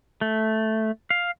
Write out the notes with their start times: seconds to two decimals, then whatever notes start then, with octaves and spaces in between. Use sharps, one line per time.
0.21 A3
1.10 F5